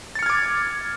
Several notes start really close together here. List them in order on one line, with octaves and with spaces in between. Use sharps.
A6 C#7 F6 G#6 D6